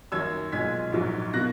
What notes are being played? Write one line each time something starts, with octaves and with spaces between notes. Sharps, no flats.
F#2 D#3 A#3 E6 G#6
B1 A#2 G#3 G#6 B6
A#1 G#2 F#3
B2 A#3 F#6 A#6